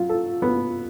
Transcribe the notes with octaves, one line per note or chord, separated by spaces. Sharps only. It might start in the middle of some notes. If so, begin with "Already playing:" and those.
Already playing: F#3 F4
A4
B3